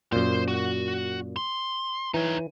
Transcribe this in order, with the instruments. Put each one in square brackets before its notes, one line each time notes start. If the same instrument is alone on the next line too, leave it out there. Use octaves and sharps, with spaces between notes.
[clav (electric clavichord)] F#2 A#2 [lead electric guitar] C5 C6
[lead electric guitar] F#4
C6
[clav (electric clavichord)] E3 [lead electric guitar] D#4 C#5